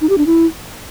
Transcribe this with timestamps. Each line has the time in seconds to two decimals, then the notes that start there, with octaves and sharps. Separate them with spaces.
0.01 D#4
0.09 G4
0.18 D4
0.26 E4